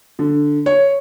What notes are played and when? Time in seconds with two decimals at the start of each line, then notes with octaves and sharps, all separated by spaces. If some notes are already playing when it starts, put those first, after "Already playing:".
0.19 D3
0.66 C#5